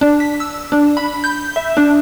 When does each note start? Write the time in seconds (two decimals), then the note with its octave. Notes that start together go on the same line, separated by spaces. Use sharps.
0.01 D4
0.20 B6
0.40 E6
0.72 D4
0.97 B5
1.24 G6
1.56 E5
1.77 D4